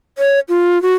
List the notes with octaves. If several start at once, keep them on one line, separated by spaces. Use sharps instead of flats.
C#5
F4
F#4